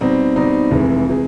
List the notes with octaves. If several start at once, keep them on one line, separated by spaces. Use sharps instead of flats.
B2 G3 C4 D#4
B2 G3 C4 D#4
F1 F2 C3 E3 G#3
C3 E3 G#3